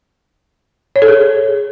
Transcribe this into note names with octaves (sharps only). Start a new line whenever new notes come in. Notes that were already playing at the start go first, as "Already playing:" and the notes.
C#5
A4
G#4